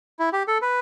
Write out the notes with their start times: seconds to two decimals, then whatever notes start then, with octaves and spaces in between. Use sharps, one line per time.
0.19 E4
0.33 G4
0.48 A4
0.62 B4